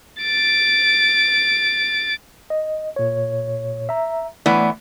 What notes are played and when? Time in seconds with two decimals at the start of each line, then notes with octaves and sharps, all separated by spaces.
0.22 A6 D7
2.50 D#5
2.96 A#2 C#5
3.89 E5 A#5
4.46 A2 E3 A3 B3 D5